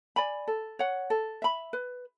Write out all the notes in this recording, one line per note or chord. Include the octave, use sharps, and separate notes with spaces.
D5 G#5 B5
A4
C#5 F#5
A4
E5 B5
B4